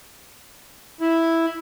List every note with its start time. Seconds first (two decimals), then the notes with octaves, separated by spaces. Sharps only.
1.01 E4